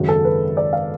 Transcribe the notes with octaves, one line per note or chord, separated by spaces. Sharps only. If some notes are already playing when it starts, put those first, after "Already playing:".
Already playing: G#1 F#2 C#3 F#4
A4
B4
D5
F5